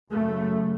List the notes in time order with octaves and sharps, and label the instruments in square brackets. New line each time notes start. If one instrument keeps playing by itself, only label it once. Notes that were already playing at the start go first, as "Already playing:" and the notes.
[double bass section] F#2 C#3 A3